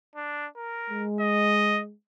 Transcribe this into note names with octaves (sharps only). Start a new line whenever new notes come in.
D4
A#4
G#3
D#5